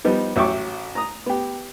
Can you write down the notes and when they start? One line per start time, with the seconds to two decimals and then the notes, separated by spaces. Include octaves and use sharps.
0.04 F3 G3 B3 D#4
0.36 A1 F#3 E5 G5 C#6 D6
0.95 A#5 D#6
1.26 B3 G4